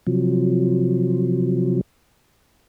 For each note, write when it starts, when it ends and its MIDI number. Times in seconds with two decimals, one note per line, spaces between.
0.07 1.81 48
0.07 1.81 53
0.07 1.81 54